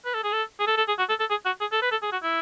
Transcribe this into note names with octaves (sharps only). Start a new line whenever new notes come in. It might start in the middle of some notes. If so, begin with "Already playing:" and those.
B4
A4
G#4
A4
G#4
A4
A4
G#4
F#4
A4
A4
G#4
F#4
G#4
A4
B4
A4
G#4
F#4
E4